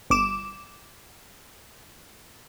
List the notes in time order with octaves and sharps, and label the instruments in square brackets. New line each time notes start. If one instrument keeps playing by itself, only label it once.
[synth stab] G1 D6 E7